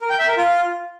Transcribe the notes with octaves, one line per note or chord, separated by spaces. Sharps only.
A#4
G5
E5
A#4
F4